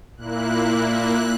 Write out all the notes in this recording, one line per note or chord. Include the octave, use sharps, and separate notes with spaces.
A#2 A#3 E4 F#6
F#6